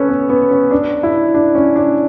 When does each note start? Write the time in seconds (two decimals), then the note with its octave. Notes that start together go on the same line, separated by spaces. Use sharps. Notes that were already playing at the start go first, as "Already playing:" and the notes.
Already playing: C#4 A4 B4 C#5
0.09 B3
0.29 B3
0.51 C#4
0.71 D4
1.03 E4
1.34 D4
1.55 C#4
1.76 D4